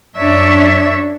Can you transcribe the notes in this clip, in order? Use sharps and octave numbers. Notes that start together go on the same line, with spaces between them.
F#2 D4 C#5 E5